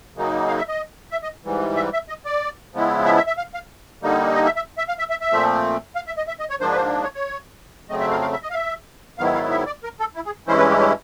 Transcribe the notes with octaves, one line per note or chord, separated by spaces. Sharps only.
F#2 C#3 F#3 A#3 D#4
F5
E5
D#5
E5
D#5
G#2 E3 G3
E5
E5
D#5
D5
C#3 F3 G#3 B3 E4
E5
E5
E5
F5
F5
D3 G3 A#3 D#4
D#5
E5
E5
E5
F5
E5
E5
E5
A#2 F3 A3 C4
F5
E5
D#5
E5
D#5
C#5
G#2 F3 A#3 D4 C5
B4
C5
C#5
C#5
F2 C#3 F#3 A3 C4 D#5
E5
F5
F5
E5
D#5
F5
E5
G#2 D#3 F#3 B3 E4 F5
F5
E5
D5
A#4
A4
E4
G#4
G2 E3 G#3 C#4 E4 C5
B4
G4
G4